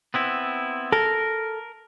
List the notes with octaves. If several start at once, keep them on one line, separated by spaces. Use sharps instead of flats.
B3 C4 E4
A4 A#4